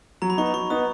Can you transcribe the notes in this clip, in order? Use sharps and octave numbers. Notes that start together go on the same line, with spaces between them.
F#3 A#5
B5
B3 D#4 C#6
B5
F#3 C#6
B3 D#4 D#6